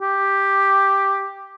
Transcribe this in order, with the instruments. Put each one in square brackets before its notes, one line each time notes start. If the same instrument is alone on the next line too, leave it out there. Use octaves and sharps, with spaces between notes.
[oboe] G4